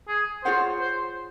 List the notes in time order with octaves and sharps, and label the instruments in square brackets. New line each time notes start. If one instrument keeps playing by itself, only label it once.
[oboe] G#4
[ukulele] F4 G#4 C#5 F#5 [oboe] C5
[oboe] C5